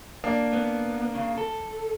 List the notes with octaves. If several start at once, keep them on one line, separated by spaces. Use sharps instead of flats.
A#3 D4
B3
C#3
A4